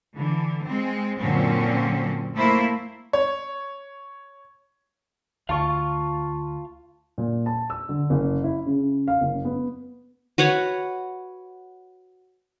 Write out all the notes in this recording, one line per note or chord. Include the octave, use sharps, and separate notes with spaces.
D3 E3
G#3 C4
F#2 A#2 D3 F#3 C4 C#4
A3 A#3 E4 C5 E5
C#5
D2 F4 F5 A5 C#6
A#2
A5
E6
D3
F#1
E4
C#3
F5
F#1
B3
F#4 B4 C#5 F#5